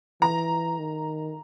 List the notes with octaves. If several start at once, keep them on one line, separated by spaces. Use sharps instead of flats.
E3 A#5
D#3